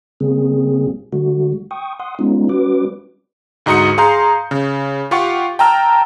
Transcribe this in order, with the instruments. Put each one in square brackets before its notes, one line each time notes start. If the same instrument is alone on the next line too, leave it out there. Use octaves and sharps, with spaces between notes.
[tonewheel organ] C#3 G3 A#3 C4 G#4
D3 G3 A3 F#4
G5 C#6 D#6
F#5 C6 D#6
G3 G#3 B3 C#4 D#4 F4
G3 C#4 F#4 B4 D6
[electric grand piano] D2 G#2 D#4 F#4 D#6 C#7
G#4 F5 A#5 C6 G6
C#3
F4 G4 F5 F#5 C#6
G5 A5 A#5 E6 F6